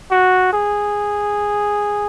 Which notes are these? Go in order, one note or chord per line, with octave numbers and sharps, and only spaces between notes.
F#4
G#4